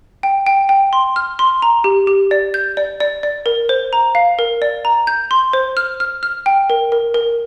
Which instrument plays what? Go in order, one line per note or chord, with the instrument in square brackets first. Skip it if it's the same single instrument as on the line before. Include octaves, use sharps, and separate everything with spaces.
[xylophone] G5
G5
G5
C6
F6
C6
A#5
G4
G4
D5
G6
D5
D5
D5
A#4
C5
A#5
F5
A#4
D5
A#5
G6
C6
C5
F6
F6
F6
G5
A#4
A#4
A#4